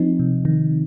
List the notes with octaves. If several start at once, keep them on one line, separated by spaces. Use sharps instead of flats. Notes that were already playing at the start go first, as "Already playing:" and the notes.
Already playing: F3 C4 D#4
C3
D#3